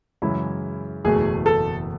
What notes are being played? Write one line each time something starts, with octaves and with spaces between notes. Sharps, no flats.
F#2 C#3 E3 G#3 C#4 E4
F#1 E2 B2 A3 G#4
A4